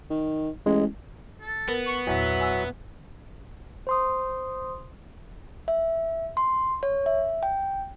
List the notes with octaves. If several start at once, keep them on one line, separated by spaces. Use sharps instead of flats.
D#3
A1 G#3
A4
B3 A#4
C#6
E2 A#2 F#3 E5
G#5 E6
C5 C6 D#6
E5
C6
C#5
E5
G5